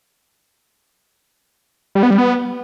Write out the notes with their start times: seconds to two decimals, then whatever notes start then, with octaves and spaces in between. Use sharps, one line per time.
1.95 G3
2.03 B3
2.11 G3
2.18 B3